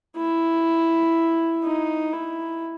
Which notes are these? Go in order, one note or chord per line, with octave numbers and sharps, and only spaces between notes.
E4
D#4
E4